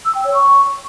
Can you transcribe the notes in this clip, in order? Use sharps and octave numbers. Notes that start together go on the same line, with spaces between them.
E6
G5
C#5
C#6